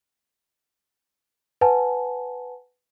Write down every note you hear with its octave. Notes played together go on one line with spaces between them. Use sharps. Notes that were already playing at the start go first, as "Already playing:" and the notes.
B4 F#5 G#5 A5